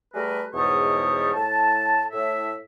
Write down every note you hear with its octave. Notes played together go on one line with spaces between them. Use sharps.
G3 A3 G#4 A#4 B4
E2 G#2 B2 G3 C#5 D#6
A2 A5
A2 E5